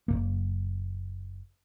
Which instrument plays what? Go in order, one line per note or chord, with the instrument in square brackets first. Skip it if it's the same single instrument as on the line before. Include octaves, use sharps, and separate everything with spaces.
[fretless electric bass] F#1 F#2 A#3